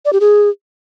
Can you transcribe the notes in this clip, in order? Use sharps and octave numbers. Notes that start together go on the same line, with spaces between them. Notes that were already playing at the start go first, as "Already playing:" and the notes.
D5
G4
G#4